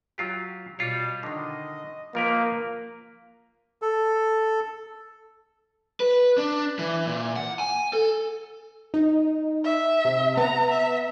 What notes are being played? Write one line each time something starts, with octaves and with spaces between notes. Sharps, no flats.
F#3 F4 G4
B2 G3 F4 C#5
D3 D#3 D#5
F3 A#3 A#4 B4
A4
B4
D4
E3
A#2
F#5
G#5
A4
D#4
E5
C3
B3 A#5
E5